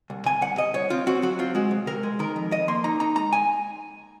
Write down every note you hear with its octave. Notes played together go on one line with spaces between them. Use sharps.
C2
C3 G#5
C2 F#5
C3 D#5
C2 C#5
C4 F4
C4 F#4
F#3 F#4
C4 F4
G#3 F#4
C3
C3 A#4
G#3
D#3 A#4
F2
F2 D#5
A#3 C6
D#4 A#5
D#4 A#5
G#3 A#5
G#5